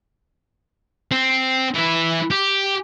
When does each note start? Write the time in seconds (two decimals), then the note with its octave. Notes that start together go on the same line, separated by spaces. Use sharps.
1.11 C4
1.74 E3 E4
2.31 G4